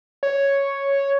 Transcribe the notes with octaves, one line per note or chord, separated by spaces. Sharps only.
C#5